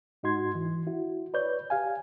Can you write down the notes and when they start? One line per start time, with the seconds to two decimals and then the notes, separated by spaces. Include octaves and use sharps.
0.23 G#2 D#4 F#4 C6 G#6
0.55 E3
0.87 E4 F#4
1.34 B4 C#5 D5 G6
1.70 G4 F5 G#5